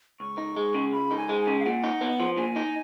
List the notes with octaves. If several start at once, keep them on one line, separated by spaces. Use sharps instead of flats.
C#2 C#6
D#4
G#3
C#3
C#2 B5
D#4
G#5
G#3
G#5
C#3
F5
A#2 F#5
D#4
B3
F3
A#2 G#5
D#4